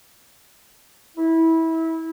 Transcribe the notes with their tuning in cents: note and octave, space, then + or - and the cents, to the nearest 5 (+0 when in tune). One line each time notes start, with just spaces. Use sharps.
E4 -20